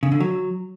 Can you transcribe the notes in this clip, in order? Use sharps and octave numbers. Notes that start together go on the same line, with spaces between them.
C#3
D3
F#3